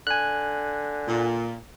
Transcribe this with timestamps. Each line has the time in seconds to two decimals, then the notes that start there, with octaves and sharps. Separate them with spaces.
0.07 D3 G#5 F#6
1.08 A#2